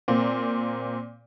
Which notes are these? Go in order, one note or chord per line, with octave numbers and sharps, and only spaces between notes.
A#2 A#3 C4